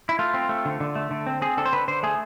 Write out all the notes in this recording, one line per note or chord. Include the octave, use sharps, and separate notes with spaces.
E4
A3 F4
C4
A3
D3
D3
A3
D3
C4
C4 G#4
D3 A4
C5
D3 B4
D3 C5
A3 G#4